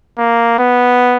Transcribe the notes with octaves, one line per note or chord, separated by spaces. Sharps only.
A#3
B3